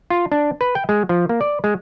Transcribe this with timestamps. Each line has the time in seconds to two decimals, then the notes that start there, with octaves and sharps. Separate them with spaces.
0.10 F4
0.32 D4
0.61 B4
0.75 G5
0.89 G#3
1.09 F3
1.29 A#3
1.41 D5
1.64 G#3